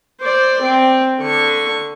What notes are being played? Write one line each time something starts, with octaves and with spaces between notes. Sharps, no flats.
C5 D5
C4
D3 C#6